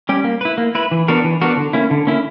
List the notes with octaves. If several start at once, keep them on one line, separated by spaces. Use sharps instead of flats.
G3 C#4 G4
A#3
E4 B4
A#3
E4 B4
E3
B3 D4 F#4 A#4
E3
B3 D4 F#4 A#4
D3
A#3 C#4 E4
D3
A#3 C#4 E4